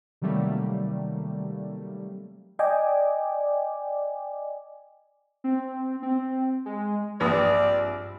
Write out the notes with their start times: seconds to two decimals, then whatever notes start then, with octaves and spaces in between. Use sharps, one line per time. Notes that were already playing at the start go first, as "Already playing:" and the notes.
0.22 C3 D#3 F#3 G3 A3 A#3
2.59 D5 D#5 G5 G#5 D6
5.44 C4
6.03 C4
6.66 G#3
7.21 A#1 G2 C4 G4 B4 D5 B5 D#6